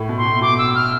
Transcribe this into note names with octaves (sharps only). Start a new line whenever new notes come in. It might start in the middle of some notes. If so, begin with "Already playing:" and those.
Already playing: A2
B2
C6
B2
B2 D6
E6
F6